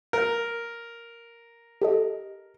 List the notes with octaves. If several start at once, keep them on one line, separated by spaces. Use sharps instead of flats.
A#4
G4 A4 D#5